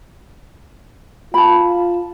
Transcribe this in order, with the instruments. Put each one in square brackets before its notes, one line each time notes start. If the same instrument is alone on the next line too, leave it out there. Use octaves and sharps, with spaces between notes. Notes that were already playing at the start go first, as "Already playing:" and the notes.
[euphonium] F4 [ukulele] A5 B5